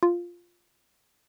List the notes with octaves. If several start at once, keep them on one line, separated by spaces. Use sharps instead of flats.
F4